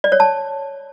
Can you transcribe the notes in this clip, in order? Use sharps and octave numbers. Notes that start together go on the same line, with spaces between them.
D5
C#5
A5